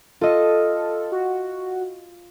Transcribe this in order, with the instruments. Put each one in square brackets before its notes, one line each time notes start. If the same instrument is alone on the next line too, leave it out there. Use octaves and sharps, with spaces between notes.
[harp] F4 D#5 [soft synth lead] A4
[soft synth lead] F#4